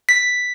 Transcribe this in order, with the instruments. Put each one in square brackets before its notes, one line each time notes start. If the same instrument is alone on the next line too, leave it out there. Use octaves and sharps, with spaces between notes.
[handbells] B6